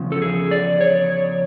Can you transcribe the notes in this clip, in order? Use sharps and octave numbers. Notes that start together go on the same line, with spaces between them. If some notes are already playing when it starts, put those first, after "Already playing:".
Already playing: E2 C#3 F3
A4
G#4
D5
C#5